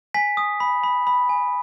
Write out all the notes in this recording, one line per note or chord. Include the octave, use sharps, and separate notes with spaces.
G#5 B6
D#6
B5
B5
B5
G#5